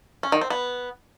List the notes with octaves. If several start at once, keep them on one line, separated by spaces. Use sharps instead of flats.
C#4
D#3
C4
B3